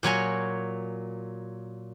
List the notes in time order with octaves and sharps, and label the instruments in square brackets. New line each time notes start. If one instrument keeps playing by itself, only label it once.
[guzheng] A#2 F#3 C#5 G#5